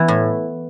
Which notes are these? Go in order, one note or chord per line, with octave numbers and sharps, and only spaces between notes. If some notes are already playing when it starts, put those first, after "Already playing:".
Already playing: E3 B3
A2